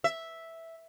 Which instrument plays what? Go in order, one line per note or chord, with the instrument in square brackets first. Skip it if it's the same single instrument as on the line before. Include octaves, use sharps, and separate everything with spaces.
[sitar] E5